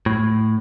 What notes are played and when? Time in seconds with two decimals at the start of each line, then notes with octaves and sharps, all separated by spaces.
0.06 A2